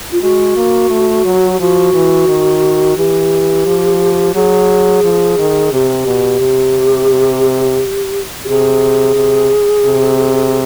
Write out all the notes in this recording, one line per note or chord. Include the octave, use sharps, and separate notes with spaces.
F4
G#3 F#4
A#3
A3
F#3
F3 F#4
E3
D#3
E3 G4
F3
F#3 G#4
F3
D#3
C3 G4
B2
C3
C3
G4
C3 G#4
C3
C3